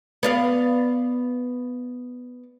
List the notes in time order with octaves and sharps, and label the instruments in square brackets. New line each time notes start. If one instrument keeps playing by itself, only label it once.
[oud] B3 D5 F5